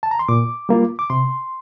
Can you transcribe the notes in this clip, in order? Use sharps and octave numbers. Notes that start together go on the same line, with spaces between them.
A5
A#5
C6
A#2 D6
G3 A#3 F4
D6
C3 C6